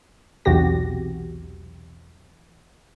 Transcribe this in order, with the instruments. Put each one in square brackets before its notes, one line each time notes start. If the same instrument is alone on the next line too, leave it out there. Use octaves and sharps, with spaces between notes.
[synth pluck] B1 E2 C3 F#4 G4 A#6